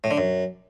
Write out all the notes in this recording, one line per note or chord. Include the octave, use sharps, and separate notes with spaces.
A2
D3
F#2